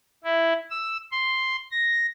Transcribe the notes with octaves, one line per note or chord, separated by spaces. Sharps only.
E4
E6
C6
A#6